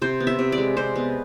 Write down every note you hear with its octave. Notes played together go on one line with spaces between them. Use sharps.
C3 C5
B3
E5
C3
D5
G#3
C3 C5
B3